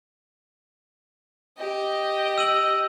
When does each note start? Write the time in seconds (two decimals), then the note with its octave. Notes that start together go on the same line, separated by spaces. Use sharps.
1.58 G4 D#5
2.38 E6 D#7 F#7